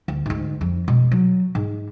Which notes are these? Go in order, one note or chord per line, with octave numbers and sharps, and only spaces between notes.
D2
D2 G#2
F2
B2 G#3
F#3
G#2